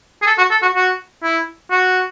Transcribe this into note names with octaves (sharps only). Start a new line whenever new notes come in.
G#4
A4
F#4
A4
F#4
F#4
E4
F#4